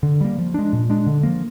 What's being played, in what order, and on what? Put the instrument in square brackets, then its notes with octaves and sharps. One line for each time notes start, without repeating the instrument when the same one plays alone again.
[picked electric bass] D3
G3 A#3
F3
G#3 D4
A#2
G#3 D4
D3
F3 A#3